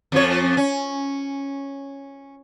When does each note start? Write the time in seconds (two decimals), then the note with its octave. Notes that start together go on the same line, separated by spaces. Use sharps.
0.12 F2 F3 C#5
0.57 C#4